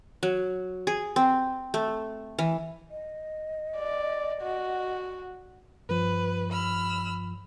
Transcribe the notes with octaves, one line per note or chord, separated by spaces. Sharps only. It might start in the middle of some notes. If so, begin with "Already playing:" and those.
F#3
G#4
C4
A3
E3
D#5
D5
F#4
G2 F3 B4
B5 E6 F6